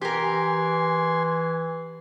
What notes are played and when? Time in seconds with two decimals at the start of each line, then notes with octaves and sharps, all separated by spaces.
0.02 E3 G4 A#4 G#5 C6